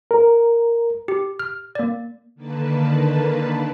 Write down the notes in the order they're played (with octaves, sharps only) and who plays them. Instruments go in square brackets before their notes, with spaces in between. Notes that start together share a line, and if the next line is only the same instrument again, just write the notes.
[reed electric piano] A#4
[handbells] G4
F6
A#3 D5
[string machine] D3 D#3 A#3 B4 A5